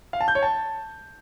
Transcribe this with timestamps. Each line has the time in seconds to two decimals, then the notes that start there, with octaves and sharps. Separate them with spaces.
0.13 F5
0.21 A5
0.28 G6
0.35 C#5
0.43 A5